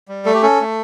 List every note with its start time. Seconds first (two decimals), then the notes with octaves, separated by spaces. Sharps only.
0.08 G3
0.25 A3 A4
0.34 G4
0.43 C#4 A4
0.60 A3